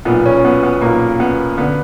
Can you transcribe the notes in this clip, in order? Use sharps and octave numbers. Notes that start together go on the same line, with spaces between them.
B1 A#2 B3
C#4
B3
B3
B1 A#2 A#3
B3
D3 B3